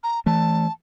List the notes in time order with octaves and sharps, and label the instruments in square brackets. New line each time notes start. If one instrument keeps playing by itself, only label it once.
[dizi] A#5
[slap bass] E3 A3 [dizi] A5